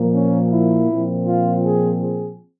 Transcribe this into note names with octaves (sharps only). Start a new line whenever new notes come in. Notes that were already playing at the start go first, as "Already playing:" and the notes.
Already playing: A#2 F3 A#3
C#4
E4
A#2 F3 C4
F4
G#4
G#4